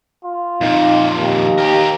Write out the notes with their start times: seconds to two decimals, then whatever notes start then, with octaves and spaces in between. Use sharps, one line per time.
0.25 F4
0.61 F2 A#2 D#4
1.17 D#2
1.58 G4 A#4